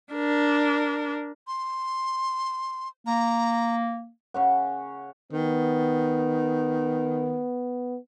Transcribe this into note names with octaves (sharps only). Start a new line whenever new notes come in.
D4 A#4
C6
A#3 A#5
C#3 C#5 F#5
D#3 B3